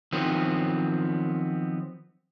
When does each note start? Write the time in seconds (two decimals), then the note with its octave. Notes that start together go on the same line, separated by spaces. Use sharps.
0.12 D#3 F3 F#3 B3 C4